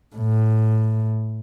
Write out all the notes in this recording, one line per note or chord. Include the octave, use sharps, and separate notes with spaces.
A2